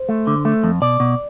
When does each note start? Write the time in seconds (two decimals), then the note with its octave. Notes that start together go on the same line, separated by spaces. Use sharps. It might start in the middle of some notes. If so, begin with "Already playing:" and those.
Already playing: C5
0.09 A3
0.27 D3
0.45 A3
0.64 F2
0.82 B2 D5
1.00 B2